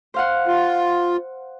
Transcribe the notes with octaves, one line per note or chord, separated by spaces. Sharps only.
C5 F5 F#5
F4